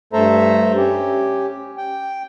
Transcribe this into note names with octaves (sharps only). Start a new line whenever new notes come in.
G2 A3 A4 C5 E5 A#5
C#4 G4
G5